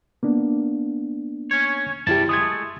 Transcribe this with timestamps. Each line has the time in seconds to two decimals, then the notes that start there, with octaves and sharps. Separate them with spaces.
0.23 A#3 B3 D4
1.51 C#4 C#5
2.07 F#2 C3 G3 E4 G4 A5
2.29 G#3 A3 D#6 G#6